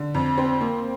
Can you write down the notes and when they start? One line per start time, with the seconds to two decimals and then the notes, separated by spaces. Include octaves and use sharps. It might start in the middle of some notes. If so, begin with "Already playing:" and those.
Already playing: D3
0.14 F2
0.38 C4
0.61 A#3